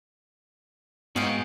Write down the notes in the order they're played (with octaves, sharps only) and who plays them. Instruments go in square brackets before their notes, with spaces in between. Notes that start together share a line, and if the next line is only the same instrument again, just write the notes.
[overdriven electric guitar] G#2 [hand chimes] B3 [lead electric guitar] F#4 [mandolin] D#5 F5 G5